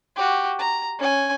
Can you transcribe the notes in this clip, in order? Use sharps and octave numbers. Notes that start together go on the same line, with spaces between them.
F#4 G4
A#5
C#4 G#5